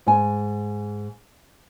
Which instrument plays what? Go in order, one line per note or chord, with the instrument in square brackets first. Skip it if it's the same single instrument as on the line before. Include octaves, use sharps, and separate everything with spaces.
[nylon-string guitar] G#2 G#5